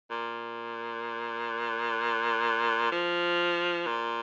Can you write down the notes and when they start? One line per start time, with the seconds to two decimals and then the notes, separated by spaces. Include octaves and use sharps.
0.10 A#2
2.92 F3
3.86 A#2